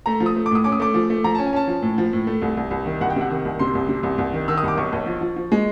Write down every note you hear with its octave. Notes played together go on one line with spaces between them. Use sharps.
A3 A#5
F3
D#6
A3
D6
A2 D#6
C#4 D6
D#6
A3 D6
F3
A3
F3 A#5
C#4 A5
G#5
C#4 A5
F3
A2
F3
A2
A3
C2
C2
C2
D#3
C2 F#5
G5
C3 F#5
D#3
C2
C3 C6
C2
C3
C2
C2
D#3
D#3 E6
D#6
C2 D6
B1 C#6
B1
F3
F3
F3
G#3